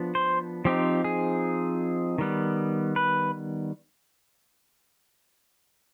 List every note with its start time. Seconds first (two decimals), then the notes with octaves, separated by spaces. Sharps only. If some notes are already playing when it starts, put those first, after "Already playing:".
Already playing: F3 B3 D4
0.15 C5
0.65 F3 C4 D#4 G4
1.04 G#4
2.18 D#3 G3 B3
2.96 B4